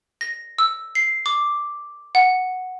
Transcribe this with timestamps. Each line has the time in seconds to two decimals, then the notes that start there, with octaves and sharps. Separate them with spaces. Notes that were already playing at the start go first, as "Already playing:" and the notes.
0.21 A#6
0.58 E6
0.95 C7
1.26 D6
2.15 F#5